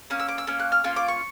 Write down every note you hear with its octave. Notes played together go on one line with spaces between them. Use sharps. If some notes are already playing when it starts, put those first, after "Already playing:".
A#3 C#4 D#6
E6
D6
E6
A#3 C#4
F#6
F6
A#3 C#4 F4
D6
C#6